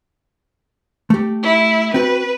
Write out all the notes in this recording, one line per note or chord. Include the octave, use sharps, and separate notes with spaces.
A3 G4
E4
C4 F#4 B4 B5